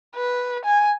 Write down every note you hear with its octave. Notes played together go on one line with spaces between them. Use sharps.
B4
G#5